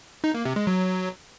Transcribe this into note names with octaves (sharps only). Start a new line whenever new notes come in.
D#4
A#3
C3
G#3
F#3